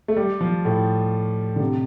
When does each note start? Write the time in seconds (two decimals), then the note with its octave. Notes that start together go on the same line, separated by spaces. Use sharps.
0.08 A3
0.17 G3
0.41 F3
0.65 A2
1.56 D3
1.60 C3